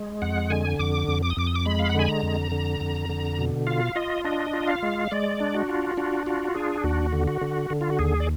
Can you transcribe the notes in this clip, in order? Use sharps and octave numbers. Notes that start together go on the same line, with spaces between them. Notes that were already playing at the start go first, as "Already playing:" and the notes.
Already playing: G#3
F2 F#5
D3 G#5
F2 D6
F2
D6
D#6
F2 D6
D#6
D6
G#3 B5
F5
F#5
D3 G#5
A#5
F2
D3
F2
D3
B2
F4 F5
F4 D#5
D4 D#5
F4
F5
G#3
G#3 D5
D4
F#4
F4
D4 F#4
F4 F#4
D4 G#4
D#2 F#4
D3
F#4
D3
D3
F4
F#4
D#2 G#4
D5